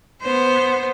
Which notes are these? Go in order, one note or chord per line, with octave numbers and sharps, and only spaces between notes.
B3 C5